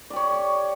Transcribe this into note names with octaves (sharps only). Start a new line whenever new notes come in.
G4 C#5 D5